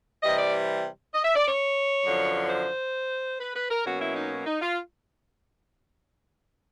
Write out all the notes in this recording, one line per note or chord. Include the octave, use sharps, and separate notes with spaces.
C3 E3 G3 D#5
D5
D#5
E5
D5
C#5
F#2 D3 F3
C5
B4
B4
A#4
B2 F#3 A#3 C#4 F#4
E4
D#4
D#4
F4